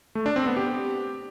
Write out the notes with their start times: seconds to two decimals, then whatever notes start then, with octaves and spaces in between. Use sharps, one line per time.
0.15 A3
0.26 D4
0.36 C4
0.46 B3
0.57 G4